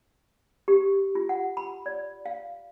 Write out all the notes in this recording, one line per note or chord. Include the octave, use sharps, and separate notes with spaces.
G4
F4
F#5
B5
D5
F5